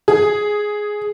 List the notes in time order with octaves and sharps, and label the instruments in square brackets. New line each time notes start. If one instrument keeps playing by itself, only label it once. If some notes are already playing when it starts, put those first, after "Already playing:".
[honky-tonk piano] G#4